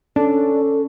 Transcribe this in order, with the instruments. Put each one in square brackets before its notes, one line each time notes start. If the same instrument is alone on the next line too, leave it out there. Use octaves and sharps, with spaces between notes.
[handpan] C#4 [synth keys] D4 [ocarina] A4